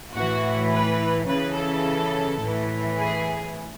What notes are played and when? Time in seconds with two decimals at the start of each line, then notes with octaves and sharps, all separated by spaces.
0.14 A2 E3 F#4
0.71 B4
1.28 C#3 E3 B4
1.56 A4
2.41 A2 E3
2.98 G#4